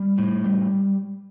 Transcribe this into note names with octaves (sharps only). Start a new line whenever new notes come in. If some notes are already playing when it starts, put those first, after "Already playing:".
Already playing: G3
A2
G3